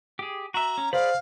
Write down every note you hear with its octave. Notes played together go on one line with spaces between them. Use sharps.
G4 G#4
F#4 E5 A#5
C#4
G#4 C5 D5 F5 B5